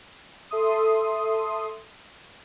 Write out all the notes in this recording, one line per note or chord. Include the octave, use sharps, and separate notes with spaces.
A4 E5 C6 D#6